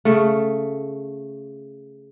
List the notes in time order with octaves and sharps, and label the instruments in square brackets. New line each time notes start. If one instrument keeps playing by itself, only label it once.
[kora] C#3 A3